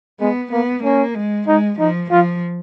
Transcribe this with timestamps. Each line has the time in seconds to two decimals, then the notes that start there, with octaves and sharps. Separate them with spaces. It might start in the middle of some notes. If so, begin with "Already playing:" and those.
0.20 G#3 B3
0.52 A#3 B3
0.84 A#3 C#4
1.15 G#3
1.48 G#3 D#4
1.79 F3 D#4
2.11 F3 F4